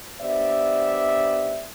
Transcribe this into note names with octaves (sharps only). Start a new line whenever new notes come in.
B3 D4 G4 C5 D5 E5